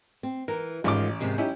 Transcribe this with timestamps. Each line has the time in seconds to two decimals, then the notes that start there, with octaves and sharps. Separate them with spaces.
0.23 C4
0.48 E3 A#4
0.84 A1 G#2 D#3 C#4 F4 D6
1.21 G#2 C3 D#3
1.38 C#4 D#4 E4 G4